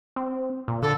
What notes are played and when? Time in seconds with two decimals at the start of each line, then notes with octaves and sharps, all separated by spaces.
0.16 C4
0.68 A#2
0.82 D3 A4